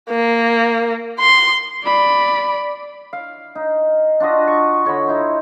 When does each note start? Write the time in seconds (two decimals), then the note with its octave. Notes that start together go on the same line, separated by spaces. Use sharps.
0.10 A#3
1.20 C6
1.84 D5 B5
3.13 F5
3.55 D#4
4.20 D4 F4 F#4 D#5
4.48 C#6
4.85 D3 C#5 D#5 B5
5.08 D#4 E4 C5